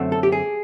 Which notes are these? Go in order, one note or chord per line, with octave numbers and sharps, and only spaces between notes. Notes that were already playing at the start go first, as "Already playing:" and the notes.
Already playing: F#2 D3 F#3 A3 C4
A4
G4
G#4